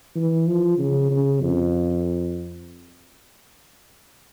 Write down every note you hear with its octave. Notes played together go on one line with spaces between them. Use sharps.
E3
F3
C#3
C#3
F2